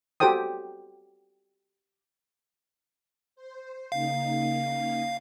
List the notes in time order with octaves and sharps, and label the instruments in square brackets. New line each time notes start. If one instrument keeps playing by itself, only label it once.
[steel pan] F#4 G4 A4 C5 G5 D#6
[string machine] C5
[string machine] C#3 A#3 D#4 [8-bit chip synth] F5